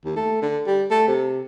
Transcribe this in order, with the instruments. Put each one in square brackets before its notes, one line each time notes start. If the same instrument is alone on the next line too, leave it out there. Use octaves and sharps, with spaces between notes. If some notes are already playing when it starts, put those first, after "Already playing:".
[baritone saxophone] D#2
A3
D3
G3
A3
C3